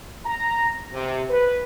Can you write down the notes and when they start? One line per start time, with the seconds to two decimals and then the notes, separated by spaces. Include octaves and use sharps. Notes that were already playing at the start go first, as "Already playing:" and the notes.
0.25 A#5
0.92 C3
1.28 B4